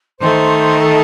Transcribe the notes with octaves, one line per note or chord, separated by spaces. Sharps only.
D#3 A3 D#4 C5
C5
A4